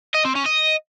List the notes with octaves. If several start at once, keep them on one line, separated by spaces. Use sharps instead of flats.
D#5
C4
C#4
D#5